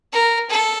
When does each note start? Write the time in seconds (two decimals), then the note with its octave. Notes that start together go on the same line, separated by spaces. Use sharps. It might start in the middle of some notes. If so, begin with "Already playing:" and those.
0.12 A#4
0.49 A4